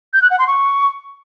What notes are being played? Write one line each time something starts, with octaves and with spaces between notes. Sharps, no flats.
G6
F#6
F#5
C6
C#6